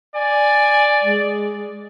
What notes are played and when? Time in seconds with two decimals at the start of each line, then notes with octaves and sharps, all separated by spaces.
0.15 D5 G#5
1.04 G#3